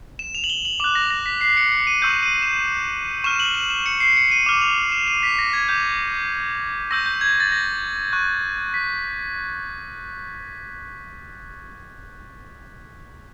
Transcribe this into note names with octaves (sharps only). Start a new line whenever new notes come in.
E7
F7
F#7
G7
F#7
D6 F#6 E7
A#6
A#6
B6
C7
C#7
C#7
D#7
C#6 E6 G6
D#7
E7
C#6 F6 E7
F#7
F#7
E7
C#7
C7
C#7
D#7
D6 F6 E7
F7
E7
D#7
B6
A#6
G#6
D6 G6
C#6 E6 G6 A#6
G6
G#6
A6
A#6
C#6 F#6
B6